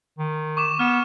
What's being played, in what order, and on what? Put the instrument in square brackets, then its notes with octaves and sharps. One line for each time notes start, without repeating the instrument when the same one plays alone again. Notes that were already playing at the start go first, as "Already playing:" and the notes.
[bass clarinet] D#3
[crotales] C#6 D6 E7
[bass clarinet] B3 [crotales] F6 E7